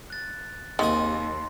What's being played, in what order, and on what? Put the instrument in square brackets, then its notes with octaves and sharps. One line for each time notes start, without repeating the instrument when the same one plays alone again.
[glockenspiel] F#6 A6
[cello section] D#2 [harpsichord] C3 A#3 G#4 [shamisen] D#3 [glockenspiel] C6